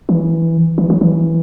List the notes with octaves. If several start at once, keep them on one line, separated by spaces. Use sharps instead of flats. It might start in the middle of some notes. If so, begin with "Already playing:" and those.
E3
E3
F#3
E3